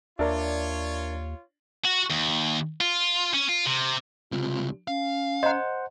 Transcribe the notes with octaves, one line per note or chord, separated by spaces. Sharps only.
D#2 D4 F4 A#4 C#5 D5 E5
F#4
D#2
F4
C#4
F4
C3
C#2 C3 F4
C#4 F5
C5 D#5 F#5 A#5